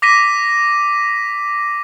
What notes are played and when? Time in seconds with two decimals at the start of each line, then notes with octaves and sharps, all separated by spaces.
0.02 D6 A#6 B6 D#7